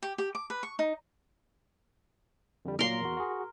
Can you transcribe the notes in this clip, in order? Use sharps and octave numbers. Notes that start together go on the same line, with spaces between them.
G4
G4
D6
B4
C#6
D#4
F2 D3 G3
A#2 F#3 A#3 A#4 C6
E2 F#4
F#4 G#4